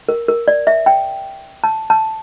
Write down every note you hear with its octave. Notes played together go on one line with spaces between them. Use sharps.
A#4
A#4
D5
E5
G5
A5
A5